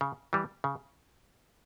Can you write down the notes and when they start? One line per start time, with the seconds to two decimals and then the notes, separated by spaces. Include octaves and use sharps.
0.01 C#3
0.33 E3 G3
0.64 C#3